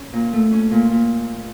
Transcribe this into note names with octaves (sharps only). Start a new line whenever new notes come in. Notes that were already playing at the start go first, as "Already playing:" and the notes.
Already playing: C#4
A#2
A3
C#4
A#2
A#2